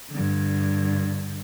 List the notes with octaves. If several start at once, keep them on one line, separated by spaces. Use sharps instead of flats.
G2 D3